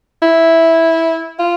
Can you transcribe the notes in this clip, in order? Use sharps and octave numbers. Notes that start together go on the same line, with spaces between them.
E4
F4